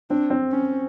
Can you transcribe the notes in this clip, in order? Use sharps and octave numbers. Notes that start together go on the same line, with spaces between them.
C4 D4
C4
C#4